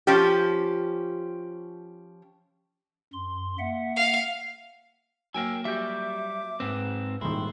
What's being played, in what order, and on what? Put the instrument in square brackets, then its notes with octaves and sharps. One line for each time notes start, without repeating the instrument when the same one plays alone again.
[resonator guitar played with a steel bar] F3 C#4 G4
[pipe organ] F#2 C6
A#3 E5 F#5
[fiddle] F5
[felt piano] F#3 A#3 F6 [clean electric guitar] A#4 G5 G#5 [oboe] E6
[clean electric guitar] G3 F#4 G4 [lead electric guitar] E5 [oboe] D6
[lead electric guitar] G#2 C4 [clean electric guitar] B4
[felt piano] D#1 G#2 D#3 [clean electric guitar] E4 [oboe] C6